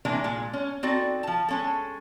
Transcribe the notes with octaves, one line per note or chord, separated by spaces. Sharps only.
C3 D#3 E3 G#3 A#3 D4
A#2 G#3
C#4
C4 D#4 F#4 A4 D5
F3 A5
G#3 C#4 A4